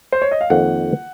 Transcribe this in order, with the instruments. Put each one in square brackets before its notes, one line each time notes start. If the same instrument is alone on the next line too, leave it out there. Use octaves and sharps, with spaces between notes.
[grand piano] C5
C#5
D#5
F5
[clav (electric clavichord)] F2 D#3 A#3 [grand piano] F#5